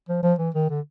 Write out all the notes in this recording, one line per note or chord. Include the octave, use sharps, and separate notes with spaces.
F3
F3
E3
D#3
D3